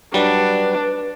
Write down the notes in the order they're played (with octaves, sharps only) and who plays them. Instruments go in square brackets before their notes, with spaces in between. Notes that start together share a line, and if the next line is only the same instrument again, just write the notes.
[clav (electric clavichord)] F#3 G3 [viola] D4 [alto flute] B4